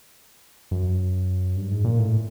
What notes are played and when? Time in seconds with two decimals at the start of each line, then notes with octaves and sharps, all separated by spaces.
0.71 F#2
1.56 G2
1.71 G#2
1.85 A#2
1.99 A2